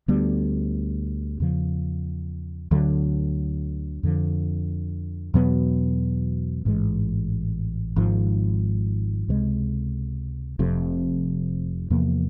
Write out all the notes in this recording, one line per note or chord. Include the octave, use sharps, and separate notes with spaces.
D2 D3 G3 B3
E2 C#3 F3
D2 D3 F#3
F2 D3 F3
E2 B2 F#3 B3
A1 G#2 E3 G#3
G#1 G#2 F3
C#2 C3 E3 G#3
F1 F2 C3
E2 C3 F3 A#3